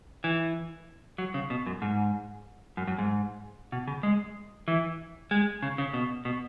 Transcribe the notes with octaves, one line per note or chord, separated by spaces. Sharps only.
E3
F#3
C#3
B2
F#2
G#2
F#2
F#2
G#2
B2
C#3
G#3
E3
G#3
C#3
C#3
B2
B2